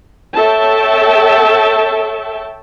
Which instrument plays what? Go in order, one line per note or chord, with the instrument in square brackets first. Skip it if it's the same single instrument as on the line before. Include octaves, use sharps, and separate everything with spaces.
[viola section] A4 C#5 E5 G5 A5